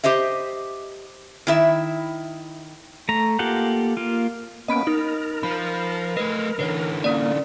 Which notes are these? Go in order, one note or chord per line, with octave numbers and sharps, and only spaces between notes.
G4 C5 D#5 E5
D#3 E4 E5
A3 A#5
A#3 F4 G4 A4 F#5
A#3 F4
A#3 B3 C#4 D#5 B5 D7
D#4 A#4
F3 B5
A3 B4 D#5
D3 E3 B4 C#5
A#3 C#4 D5